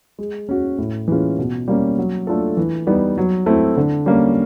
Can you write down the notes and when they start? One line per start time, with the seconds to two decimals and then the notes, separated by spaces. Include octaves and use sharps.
0.19 G#3
0.49 C#4 F#4
0.78 A2
1.08 E3 G#3 C#4 F4
1.39 B2
1.68 G3 A#3 C#4
1.98 F#3
2.27 A3 D4 F4 A4
2.57 E3
2.87 G3 B3 D#4
3.18 F#3
3.46 A3 C4 E4
3.77 D3
4.06 G3 A#3 C#4